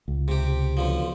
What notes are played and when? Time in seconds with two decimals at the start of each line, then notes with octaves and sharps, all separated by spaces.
0.08 C#2
0.28 C3 G4
0.77 B1 D3 F3